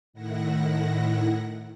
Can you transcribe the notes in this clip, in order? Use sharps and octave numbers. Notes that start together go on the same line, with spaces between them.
A2 D#3 E4 F#5 A#6